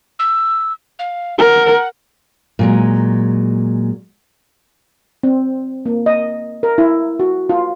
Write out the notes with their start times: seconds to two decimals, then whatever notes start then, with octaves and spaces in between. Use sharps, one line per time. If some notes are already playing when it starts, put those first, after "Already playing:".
0.19 E6
0.99 F5
1.38 A#4 F#5
2.59 A#2 F#3 G#3
5.23 C4
5.86 A#3
6.06 D#5
6.63 A#4
6.78 E4
7.20 F#4
7.50 F4